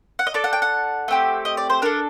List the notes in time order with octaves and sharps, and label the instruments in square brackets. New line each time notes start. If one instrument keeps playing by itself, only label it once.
[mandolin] F#5
D#5
D4 A4 D5
F#5
G5
F#5
A3 C4 G4
D#5
D5
C5
D4 A4 A#4